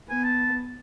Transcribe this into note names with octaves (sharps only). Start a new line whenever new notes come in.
B3 G#5
A5